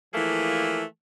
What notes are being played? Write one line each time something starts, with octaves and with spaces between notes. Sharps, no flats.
E3 F3 A3 A#3 G#4